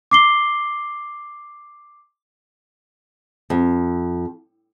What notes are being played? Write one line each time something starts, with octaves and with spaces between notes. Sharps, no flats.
D6 C7 G7
F2